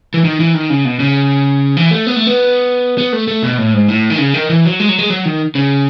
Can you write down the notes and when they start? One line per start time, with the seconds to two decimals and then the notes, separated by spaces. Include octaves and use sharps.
0.14 E3
0.25 D#3
0.40 E3
0.54 D#3
0.70 C#3
0.85 B2
1.00 C#3
1.77 E3
1.91 A3
2.06 B3
2.16 A3
2.27 B3
2.98 B3
3.13 A3
3.28 A3
3.43 B2
3.58 A2
3.74 G#2
3.88 A2
4.10 D#3
4.18 C#3
4.34 D#3
4.50 E3
4.65 F#3
4.80 G#3
4.89 F#3
4.98 G#3
5.10 F#3
5.25 D#3
5.55 C#3